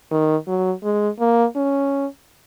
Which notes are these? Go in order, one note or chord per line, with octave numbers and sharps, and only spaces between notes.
D#3
F#3
G#3
A#3
C#4